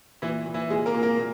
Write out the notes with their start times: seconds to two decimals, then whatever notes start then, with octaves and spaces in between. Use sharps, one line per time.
0.22 A#2 E3 E4
0.46 A#2
0.54 E3 E4
0.70 A#2 G#3 G#4
0.86 A#3 A#4
0.94 A#2
1.03 A#3 A#4
1.18 A#2